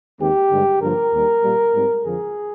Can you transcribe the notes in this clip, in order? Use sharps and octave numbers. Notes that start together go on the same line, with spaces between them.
D#2 D#3 G#3 C4 G4
G2 D3 G#3
G2 D3 F3 A#3 A#4
D#2 D#3 G3
A#2 G3 A#3
G#2 G3 C4
F2 D3 F3 G#4